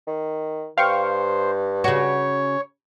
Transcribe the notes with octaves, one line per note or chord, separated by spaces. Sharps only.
D#3
G2 C5 F5 G5 C#6
C#3 F#4 C#5